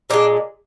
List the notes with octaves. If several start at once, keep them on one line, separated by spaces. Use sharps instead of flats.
A#2 F3 G#3 D4